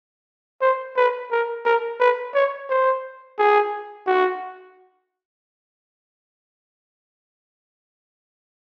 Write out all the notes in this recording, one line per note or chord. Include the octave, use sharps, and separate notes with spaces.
C5
B4
A#4
A#4
B4
C#5
C5
G#4
F#4